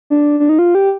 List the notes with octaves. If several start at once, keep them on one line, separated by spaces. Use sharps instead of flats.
D4
D4
D#4
F4
G4